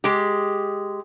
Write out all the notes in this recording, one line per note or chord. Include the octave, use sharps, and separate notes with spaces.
G#3 G4